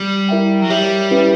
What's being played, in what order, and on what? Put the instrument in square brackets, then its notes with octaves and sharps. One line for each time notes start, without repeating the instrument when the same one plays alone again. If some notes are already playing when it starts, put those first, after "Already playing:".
Already playing: [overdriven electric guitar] G3
[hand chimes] E4 A#4 E5 G5
[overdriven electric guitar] F#3
[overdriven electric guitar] G3 [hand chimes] G4 C#5 E5
[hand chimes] C#4 E4 G4 B4 E5